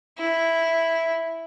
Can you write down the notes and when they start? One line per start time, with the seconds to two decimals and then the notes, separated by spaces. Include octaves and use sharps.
0.19 E4